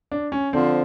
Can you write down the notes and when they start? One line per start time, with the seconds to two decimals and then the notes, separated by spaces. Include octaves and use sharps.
0.12 D4
0.32 C#4
0.53 D3 F3 C4